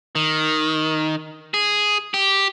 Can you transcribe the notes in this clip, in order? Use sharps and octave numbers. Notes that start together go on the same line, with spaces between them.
D#3
G#4
G4